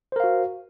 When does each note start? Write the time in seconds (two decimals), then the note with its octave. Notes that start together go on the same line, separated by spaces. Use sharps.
0.12 C5
0.16 A#4
0.20 F5
0.24 F#4